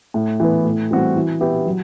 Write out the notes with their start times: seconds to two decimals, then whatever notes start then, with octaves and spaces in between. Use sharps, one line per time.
0.14 A2
0.40 E3 B3
0.64 A2
0.91 E3 G3 C4 F#4
1.16 E3
1.41 B3 E4 G4
1.66 F#3